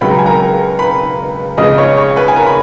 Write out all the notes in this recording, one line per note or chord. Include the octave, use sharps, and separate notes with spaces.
C#2 C#3 F#3 B5
A#5
G#5
A#4 A#5
B4 B5
F2 C#3 G#3 B3 D#5 D#6
C#5 C#6
C#5 C#6
B4 B5
G#5
A#4 A#5
B5